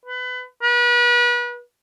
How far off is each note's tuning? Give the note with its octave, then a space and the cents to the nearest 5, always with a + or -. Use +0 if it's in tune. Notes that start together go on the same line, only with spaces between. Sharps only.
B4 +25
B4 -35